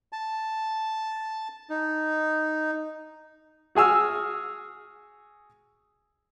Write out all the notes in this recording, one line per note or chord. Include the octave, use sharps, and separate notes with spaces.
A5
D#4
F#4 G#4 G#5 E6 F6